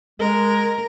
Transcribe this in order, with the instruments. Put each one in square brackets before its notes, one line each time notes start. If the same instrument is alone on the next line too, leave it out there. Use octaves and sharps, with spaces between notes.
[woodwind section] G#3 [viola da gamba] A#4